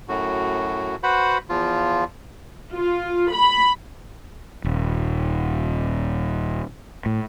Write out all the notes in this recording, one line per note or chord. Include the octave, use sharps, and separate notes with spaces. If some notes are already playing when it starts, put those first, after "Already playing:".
F#2 A2 F#4
F#4 B4 C5 F#5 B5
E2 F3 F4
F4
B5
D#1
A2